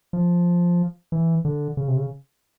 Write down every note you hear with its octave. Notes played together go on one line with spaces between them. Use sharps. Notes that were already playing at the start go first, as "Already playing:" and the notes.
F3
E3
D3
C#3
C3
C#3